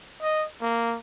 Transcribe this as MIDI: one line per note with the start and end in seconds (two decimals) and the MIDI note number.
0.22 0.46 75
0.61 0.97 58